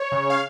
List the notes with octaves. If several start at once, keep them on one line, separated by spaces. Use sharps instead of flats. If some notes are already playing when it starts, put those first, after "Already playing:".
Already playing: C#5
C#3
F5